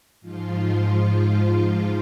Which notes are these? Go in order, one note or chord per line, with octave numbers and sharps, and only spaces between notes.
G#2 F3 F4